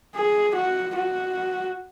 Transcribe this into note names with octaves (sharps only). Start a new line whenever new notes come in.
G#4
F#4
F#4